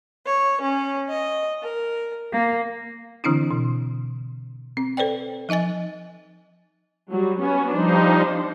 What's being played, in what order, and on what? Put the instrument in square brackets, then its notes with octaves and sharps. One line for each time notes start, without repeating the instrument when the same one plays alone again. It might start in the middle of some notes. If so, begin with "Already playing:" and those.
[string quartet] C#5
C#4
D#5
A#4
A#3
[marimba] D3 E3 C4 D4 E4
B2
C4
A4 B4 C5 D5 G5
F3 D#4 D#5 G#5 A6
[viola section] F#3 G3
B3 C#4 F#4
[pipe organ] F3 G3 D#4 [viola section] D4 C5